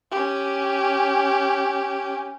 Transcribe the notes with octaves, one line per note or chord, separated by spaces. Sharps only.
C#4 G4